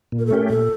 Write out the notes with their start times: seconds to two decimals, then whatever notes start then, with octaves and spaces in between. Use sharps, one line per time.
0.12 A#2
0.19 A#4
0.26 A4
0.31 A3 C#4 G4 A#4
0.49 A#2 A4